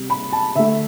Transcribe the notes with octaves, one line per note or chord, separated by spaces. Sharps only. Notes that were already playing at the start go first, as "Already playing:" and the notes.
Already playing: C3 G3
B5
A5
D3 A3 E5